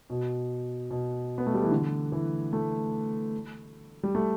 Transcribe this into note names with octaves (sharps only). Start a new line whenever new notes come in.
B2
B2
B3
A3
G3
E3
D3
E3
A3
G3
A3